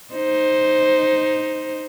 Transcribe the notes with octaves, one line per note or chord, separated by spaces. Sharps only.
D#4 C5